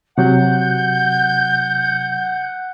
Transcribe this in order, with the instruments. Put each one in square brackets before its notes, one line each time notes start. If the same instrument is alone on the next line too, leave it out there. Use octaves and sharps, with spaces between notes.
[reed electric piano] C3 F#3 [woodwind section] F#5 [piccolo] G6